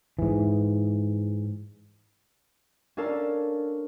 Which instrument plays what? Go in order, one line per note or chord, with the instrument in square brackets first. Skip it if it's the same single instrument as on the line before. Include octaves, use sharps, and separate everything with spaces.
[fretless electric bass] G#2 E3
[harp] C#4 D4 A4 A#4 F5 A5